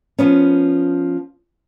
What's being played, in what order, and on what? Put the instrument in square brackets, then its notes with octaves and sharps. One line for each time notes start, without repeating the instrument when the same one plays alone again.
[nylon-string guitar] F3 B3 C#4